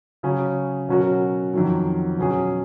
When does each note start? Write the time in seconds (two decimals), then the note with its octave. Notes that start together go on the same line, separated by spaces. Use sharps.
0.23 C#3 F#3 C#4 G#4
0.89 B2 F#3 C#4 F#4 A#4
1.54 F2 D#3 F#3
2.18 B2 F#3 C#4 G#4